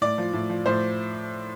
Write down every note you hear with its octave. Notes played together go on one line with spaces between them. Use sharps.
A2 D5
F3
A2
F3
A2 C5